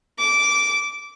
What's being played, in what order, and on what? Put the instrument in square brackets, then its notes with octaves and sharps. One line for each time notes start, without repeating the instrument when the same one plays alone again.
[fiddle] D6